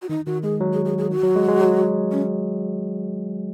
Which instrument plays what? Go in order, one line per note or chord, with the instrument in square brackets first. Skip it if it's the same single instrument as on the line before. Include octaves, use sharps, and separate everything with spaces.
[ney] F#4
[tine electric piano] D#3 [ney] D#4
[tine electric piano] D#3 [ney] F#4
[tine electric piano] G#3 [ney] G#4
[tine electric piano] F#3
[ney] G#4
G#4
G#4
[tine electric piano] D#3 [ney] F#4
[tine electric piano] F#3
G#3
G#3
F#3
[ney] C#4